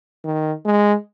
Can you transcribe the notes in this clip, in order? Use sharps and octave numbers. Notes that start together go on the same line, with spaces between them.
D#3
G#3